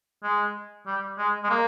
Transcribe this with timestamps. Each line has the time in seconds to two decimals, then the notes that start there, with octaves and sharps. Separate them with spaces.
0.23 G#3
0.86 G3
1.18 G#3
1.44 G#3
1.50 A#3